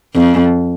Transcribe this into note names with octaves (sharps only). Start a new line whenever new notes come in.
F2